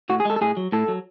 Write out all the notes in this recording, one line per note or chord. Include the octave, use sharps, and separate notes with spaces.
A2 F#4
G#4
G#3 A4
A4
A2 G#4
F#3
A2 A4
F#3